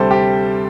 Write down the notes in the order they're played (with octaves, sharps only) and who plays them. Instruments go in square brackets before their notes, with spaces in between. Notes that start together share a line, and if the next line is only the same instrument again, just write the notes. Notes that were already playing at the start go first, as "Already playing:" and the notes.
Already playing: [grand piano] D2 C3 G3 A4 C5
G4